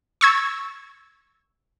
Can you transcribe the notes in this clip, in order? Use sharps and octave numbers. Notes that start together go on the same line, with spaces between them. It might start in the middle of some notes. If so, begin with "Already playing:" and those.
C#6 E6 G#6